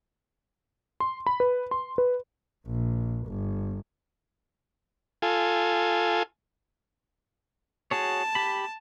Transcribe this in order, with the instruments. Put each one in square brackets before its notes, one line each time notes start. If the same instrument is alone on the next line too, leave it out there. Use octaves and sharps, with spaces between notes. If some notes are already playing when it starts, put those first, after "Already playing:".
[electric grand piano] C6
B5
B4
C6
B4
[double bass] A#1
G1
[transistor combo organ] F4 A4 G#5
[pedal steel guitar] F#4 G#4 C#5 [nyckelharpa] A5
[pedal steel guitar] G4 B5